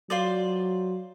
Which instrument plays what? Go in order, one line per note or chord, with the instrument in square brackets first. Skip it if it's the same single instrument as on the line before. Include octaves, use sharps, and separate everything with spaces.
[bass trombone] F#3 [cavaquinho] F4 C5 D5